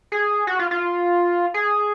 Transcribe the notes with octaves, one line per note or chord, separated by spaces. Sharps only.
G#4
F#4
F4
F4
G#4